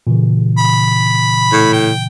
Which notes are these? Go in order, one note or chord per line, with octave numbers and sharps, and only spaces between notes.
A#2 C#3 E3
B5
A2
G5